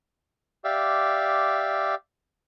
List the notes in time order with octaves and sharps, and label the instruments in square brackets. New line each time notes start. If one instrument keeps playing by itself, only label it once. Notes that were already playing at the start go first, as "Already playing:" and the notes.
[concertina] G4 D5 E5 F5